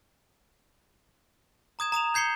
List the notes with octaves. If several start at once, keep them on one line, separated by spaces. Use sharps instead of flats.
A#5 D#6 G#6 E7
A#5 D#6 E7 F7
G6 G#6 C7 C#7 G7